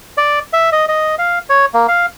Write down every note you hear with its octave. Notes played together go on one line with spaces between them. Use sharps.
D5
E5
D#5
D#5
F5
C#5
A#3
F5